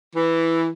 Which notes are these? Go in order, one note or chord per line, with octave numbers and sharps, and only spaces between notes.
E3